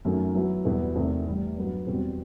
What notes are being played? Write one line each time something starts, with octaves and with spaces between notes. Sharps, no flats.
F#2 D#3 F#3 A3
F#3 B3 E4
E2 B2 G3 B3 E4
E2 C3 D#3 A3
A2 E3 G3
G2 F#3 B3
E2 B2 G3 C4 F#4